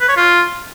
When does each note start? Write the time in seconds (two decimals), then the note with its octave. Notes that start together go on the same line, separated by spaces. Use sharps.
0.01 B4
0.09 C#5
0.17 F4